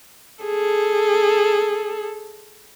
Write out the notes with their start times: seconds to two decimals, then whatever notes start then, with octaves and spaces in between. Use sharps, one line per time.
0.44 G#4 A4